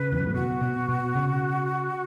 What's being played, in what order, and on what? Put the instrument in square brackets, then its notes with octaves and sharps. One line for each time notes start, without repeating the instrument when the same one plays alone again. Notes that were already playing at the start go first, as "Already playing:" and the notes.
Already playing: [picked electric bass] C#3 [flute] B4
[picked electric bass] E2
F#2
A2
[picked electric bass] B2 [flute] F#4
[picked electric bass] B2
B2
C#3